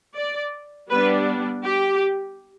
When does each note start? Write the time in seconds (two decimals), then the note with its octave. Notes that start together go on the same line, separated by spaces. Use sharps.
0.16 D5
0.90 G3 B3 D4 B4
1.65 G4